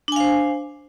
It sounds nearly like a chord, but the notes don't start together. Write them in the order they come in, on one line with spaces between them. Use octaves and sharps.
D4 G#5 F5 C5